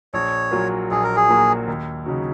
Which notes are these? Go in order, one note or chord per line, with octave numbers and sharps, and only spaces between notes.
A#1 C#5
A#2 F#3 A#3 F#4
A#1 G#4
A#4
G#4
A#2 F#3 A#3 F#4
D#2
C#3 F#3 D#4 F#4